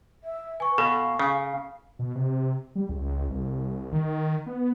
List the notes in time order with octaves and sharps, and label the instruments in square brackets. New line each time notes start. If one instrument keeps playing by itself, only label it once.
[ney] E5
[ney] B4 [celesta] G#5 C#6
[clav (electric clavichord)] B2 [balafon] A4 [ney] F5
[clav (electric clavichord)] C#3
[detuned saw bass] B2
C3
G3
C#2
C2
D#3
B3